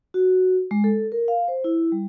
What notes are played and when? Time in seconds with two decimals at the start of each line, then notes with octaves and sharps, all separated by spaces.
0.14 F#4
0.71 G#3
0.84 A4
1.12 A#4
1.28 F5
1.48 C5
1.64 E4
1.92 G3